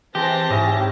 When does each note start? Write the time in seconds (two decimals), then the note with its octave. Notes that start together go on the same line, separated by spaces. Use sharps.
0.15 E3 G#3 C4 G4 A5 A#6
0.50 G#2 C#4 E4 D#5